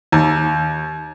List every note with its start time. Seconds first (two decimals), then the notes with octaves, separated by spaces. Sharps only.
0.12 D#2